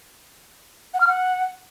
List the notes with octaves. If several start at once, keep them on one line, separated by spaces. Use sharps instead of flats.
F#5
F6
F#5